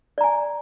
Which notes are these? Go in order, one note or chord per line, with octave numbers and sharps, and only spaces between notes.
D5 G#5 A#5